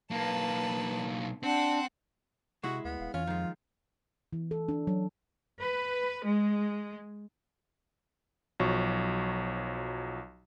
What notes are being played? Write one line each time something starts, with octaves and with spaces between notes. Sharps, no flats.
B1 A#3 B4 A5
C4 D4 F#5
C3 G#3 E4 F#4
D2 B3
D#1 F5
F2 E3 C#4 F4
D#3 F3 G#3
E3
A4
D4
F#3
B4
G#3
B1 F3 F#3 C#6